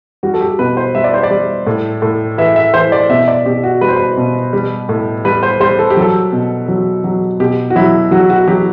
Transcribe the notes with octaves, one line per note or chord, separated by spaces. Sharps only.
G3 F#4
A4
G4
B2 B4
C5
G3 E5
D5
C5
D5
G3
A2
A2
E3 E5
E5
E3 C5
D5
B2 E5
D5
B2 G4
F#4
G3 B4
C5
B4
B2
G3
A2
G3 B4
C5
G3 C5
A4
G4
F#3
A4
B2
F#3
F#3
B2 G4
F#4
F#3 E4
F#3 F#4
F#4
F#3 G4